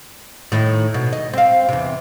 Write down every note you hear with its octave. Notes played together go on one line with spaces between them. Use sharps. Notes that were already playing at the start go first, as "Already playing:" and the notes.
A2 D#3
B2
D#5
C4 F5
E2 C3